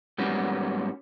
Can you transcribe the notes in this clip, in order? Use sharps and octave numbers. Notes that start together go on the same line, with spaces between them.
G#2 F#3 G3 A#3 B3 C#4